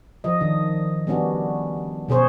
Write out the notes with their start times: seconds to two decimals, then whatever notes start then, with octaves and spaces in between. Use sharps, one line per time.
0.24 F3 D#5
0.41 D#3 D4
1.07 G3 B3 C#4 D4 F#4
2.09 B2 C#4 G#4 C5 C#5